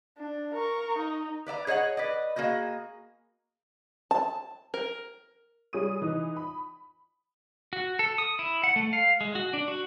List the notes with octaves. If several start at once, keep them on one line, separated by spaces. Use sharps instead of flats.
D4
A#4 C#6
D#4
B4 D5 E5 A#5
G#4 C#5 D#5 F5 F#5
B4 D5 D#5
A#3 F#4 G#4 D#5
A5
A#4
G3 G#4 C#5 D#6 D#7
E3 D#4
B5
F#4
A4
D#6
E4
F#5
A3
F5
G#3
F#4
D4
F#4